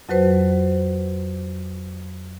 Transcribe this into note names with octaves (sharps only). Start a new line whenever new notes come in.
F2 F#3 F#4 B4 C5